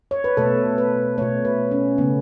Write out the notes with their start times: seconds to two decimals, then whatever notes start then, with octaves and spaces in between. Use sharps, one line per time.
0.11 C#5
0.24 B4
0.37 B2 A3 A4
0.78 B4
1.18 B2 A3 C#5
1.45 B4
1.71 C#4
1.98 C#3 A3 B3